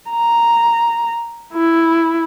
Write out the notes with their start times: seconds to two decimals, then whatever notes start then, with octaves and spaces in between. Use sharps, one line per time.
0.10 A#5
1.54 E4